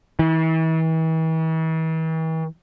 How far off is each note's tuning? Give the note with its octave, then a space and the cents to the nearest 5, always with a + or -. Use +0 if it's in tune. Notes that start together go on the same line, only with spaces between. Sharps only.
E3 -40